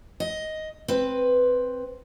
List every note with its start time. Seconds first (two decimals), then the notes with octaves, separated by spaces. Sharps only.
0.20 D#5
0.88 C4 B4